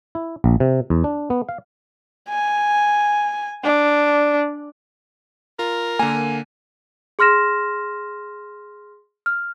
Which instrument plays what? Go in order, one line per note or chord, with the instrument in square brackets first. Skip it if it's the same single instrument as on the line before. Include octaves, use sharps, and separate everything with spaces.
[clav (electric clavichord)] E4
A#1
C3
E2
D4
B3
F5
[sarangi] G#5
D4
[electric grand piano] F4 [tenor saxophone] A#4
[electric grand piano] D3 A#3 [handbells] G#5
[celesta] G#4 C6 F6 A#6 E7
F6